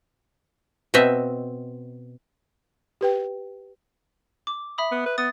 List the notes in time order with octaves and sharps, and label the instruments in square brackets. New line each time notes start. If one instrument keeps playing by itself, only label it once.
[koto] B2 C4 D#5 E5
[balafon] G4 B4 G5
[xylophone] D6
E5 B5 D#6
[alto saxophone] B3
B4
[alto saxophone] B3 [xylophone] D#6 A6